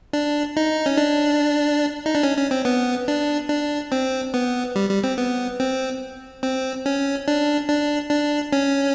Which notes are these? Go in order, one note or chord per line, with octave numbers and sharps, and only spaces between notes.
D4
D#4
C#4
D4
D#4
D4
C#4
C#4
C4
B3
D4
D4
C4
B3
G3
G3
C4
B3
C4
C4
C#4
D4
D4
D4
C#4